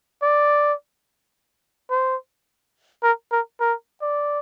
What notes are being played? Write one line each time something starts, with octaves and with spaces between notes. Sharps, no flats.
D5
C5
A#4
A#4
A#4
D5